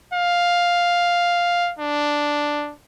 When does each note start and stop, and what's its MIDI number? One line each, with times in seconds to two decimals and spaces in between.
0.14 1.72 77
1.79 2.73 62